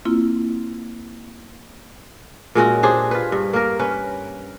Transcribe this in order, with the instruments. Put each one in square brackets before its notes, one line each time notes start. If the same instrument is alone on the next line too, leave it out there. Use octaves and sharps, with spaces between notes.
[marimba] A#3 C4 E4 F4
[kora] A#2 G#3 C#4 F#4
D4 G4 G#4 C5
F4 B4
G2
A#3 A#4
C#4 B4